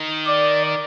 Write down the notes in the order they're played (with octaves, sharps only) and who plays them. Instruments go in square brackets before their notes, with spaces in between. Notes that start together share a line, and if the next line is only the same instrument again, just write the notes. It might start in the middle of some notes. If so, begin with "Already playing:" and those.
Already playing: [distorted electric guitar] D#3
[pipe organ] D5